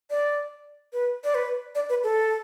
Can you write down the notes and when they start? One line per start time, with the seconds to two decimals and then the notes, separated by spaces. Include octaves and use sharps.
0.10 D5
0.93 B4
1.24 D5
1.34 B4
1.75 D5
1.89 B4
2.04 A4